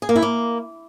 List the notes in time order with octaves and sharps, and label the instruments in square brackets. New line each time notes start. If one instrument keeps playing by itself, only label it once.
[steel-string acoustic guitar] G#4
A#3
E4
A#3